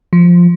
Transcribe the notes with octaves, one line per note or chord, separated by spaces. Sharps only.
F3